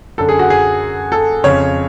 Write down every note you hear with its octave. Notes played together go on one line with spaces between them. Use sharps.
F#2 D3 A4
G#4
F#4
G#4
A4
F2 C#3 C#5